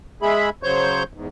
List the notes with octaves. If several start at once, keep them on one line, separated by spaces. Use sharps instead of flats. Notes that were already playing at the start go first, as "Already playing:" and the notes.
G#3 G#4 E5 B5
C#3 F#3 C5 C#5 C#6 G6
E2 G#2